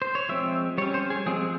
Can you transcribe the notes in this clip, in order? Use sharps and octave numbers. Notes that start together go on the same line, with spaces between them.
C5
C#5
F3 G#3 C4 E5
G3 C#4 C#5
C5
G#4
F3 G#3 C4 G#4